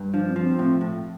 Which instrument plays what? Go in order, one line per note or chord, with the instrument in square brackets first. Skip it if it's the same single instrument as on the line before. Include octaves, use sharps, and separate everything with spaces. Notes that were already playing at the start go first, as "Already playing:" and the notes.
Already playing: [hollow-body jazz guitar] G2
[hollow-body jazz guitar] F3 [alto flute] D4
[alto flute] C4
[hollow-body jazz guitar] F3
[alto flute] C4
[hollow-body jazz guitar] A2
A2